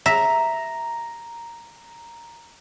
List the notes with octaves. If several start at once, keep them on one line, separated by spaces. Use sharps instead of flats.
E5 A#5